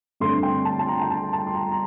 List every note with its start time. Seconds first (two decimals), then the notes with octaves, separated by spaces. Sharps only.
0.20 G2 D3 A3 C4 C6
0.43 G5
0.65 A5
0.79 A5
0.88 A#5
1.02 G5
1.10 A5
1.33 A5
1.47 C6
1.55 A#5
1.72 A#5